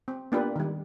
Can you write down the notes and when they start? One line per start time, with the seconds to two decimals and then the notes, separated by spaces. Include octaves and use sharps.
0.08 C4
0.32 A#3 B3 D4 F4 G4 B4
0.56 D#3 G3